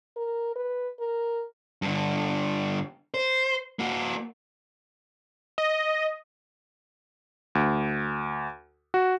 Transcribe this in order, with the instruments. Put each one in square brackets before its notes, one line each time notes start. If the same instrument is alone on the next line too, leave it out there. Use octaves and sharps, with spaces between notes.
[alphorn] A#4
B4
A#4
[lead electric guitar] G2 D3
C5
A#3 F#4
[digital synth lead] D#5
[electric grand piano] D2
F#4